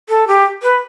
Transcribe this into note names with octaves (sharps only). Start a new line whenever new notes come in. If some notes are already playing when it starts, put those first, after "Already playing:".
A4
G4
B4